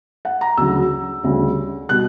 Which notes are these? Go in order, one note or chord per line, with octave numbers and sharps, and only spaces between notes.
F#5
A#5
D2 C#3 F#3 E6
D2 C#3 G3
B2 G3 F#6